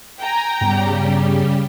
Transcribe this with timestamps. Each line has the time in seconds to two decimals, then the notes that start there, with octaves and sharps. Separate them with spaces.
0.19 G5 G#5 A#5
0.61 G2 C#3 G3 B3 G4